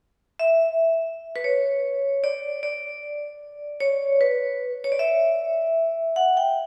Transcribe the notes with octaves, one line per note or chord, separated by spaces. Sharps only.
E5
B4
C#5
D5
D5
C#5
B4
C#5
D5
E5
F#5
G5